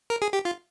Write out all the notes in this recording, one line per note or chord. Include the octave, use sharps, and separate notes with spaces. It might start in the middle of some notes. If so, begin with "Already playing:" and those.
A#4
G#4
G4
F4